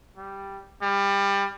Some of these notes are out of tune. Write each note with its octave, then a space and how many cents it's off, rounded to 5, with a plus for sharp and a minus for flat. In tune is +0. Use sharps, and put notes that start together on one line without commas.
G3 +0
G3 +25